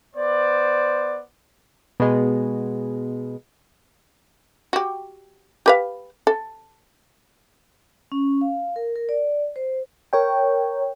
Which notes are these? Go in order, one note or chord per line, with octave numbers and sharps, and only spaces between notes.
B3 C5 D5
B2 G#3
F#4 G4
G4 B4 F5
A4
C#4
F5
A#4
A#4
D5
C5
A#4 C#5 G5